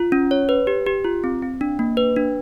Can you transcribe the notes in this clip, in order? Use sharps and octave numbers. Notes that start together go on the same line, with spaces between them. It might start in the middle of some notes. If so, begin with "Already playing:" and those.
Already playing: F4
C#4
C#5
B4
G4
G4
F4
C4
C4
D4
A#3
B4
D4